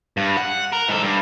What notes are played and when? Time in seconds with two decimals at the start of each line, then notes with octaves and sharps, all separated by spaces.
0.17 G2
0.37 F#5
0.73 A#4
0.89 G#2 A4
1.03 G2